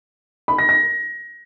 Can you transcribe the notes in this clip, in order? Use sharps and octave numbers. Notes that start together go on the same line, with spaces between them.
B5
A#6
A#6